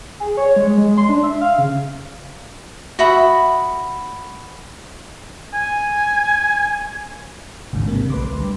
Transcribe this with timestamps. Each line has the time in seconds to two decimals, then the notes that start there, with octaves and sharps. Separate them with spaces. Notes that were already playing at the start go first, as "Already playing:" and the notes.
0.20 G#4
0.37 C#5
0.56 G#3
0.78 G#3
0.98 C6
1.09 D4
1.23 E5
1.41 F5
1.58 C#3
2.99 F#4 E5 B5 D#6
5.54 G#5
7.73 A1 D#2 G#2 C#3 D4
7.88 C3 A#3
8.10 B1 A3 B4 C6 D6
8.25 D2
8.40 G3 D4